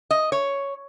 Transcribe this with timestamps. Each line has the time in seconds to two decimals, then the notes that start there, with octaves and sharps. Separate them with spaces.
0.11 D#5
0.32 C#5